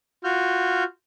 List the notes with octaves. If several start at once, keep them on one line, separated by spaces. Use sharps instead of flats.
F4 F#4 F6 G6